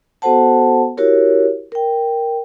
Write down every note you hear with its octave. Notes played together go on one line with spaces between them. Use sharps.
B3 F#4 A4 C5 F#5 A5
E4 F#4 G4 A#4 C#5
A#4 G5